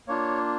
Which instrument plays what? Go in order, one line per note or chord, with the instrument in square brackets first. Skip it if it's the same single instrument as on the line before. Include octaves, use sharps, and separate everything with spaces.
[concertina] A#3 D4 F4 C#5